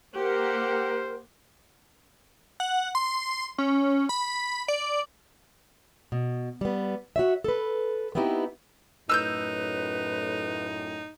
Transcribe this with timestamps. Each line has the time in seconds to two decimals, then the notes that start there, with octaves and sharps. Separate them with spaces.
0.15 A#3 G4 A#4 C5 F#5
2.60 F#5
2.95 C6
3.58 C#4
4.09 B5
4.68 D5
6.12 B2
6.61 G3 B3
7.16 F#4 C#5 E5
7.44 A4 B4
8.15 B3 C4 D#4 E4 G4
9.09 F#2 A2 D#4 B4 E6 F#6 G6